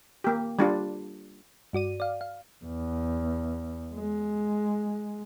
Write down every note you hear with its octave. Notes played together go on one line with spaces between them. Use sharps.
A#3 G4
G3 D4 F4
G2 F#4 D5 D#7
D5 F5
F5
E2
G#3